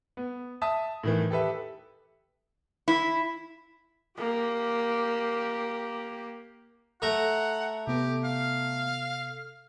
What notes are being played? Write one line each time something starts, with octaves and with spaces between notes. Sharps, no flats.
B3
E5 A5 D#6
A2 D#3 E3
G4 A4 B4 E5
E4
A#3 G4
A3 F#5 A#5
C3 B3 G4 A4
F5